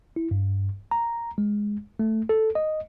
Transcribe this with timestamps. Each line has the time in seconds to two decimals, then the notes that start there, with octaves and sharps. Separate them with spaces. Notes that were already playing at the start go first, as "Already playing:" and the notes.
0.16 E4
0.31 G2
0.91 A#5
1.38 G#3
1.99 A3
2.29 A4
2.55 D#5